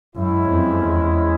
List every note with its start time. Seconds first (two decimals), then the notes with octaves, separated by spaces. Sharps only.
0.16 F#2 G#3 C#4 E4
0.49 F2
0.82 E2